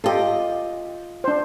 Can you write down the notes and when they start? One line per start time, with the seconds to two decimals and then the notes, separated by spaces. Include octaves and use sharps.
0.04 F4 G4 A4 D#5
1.24 D4 C5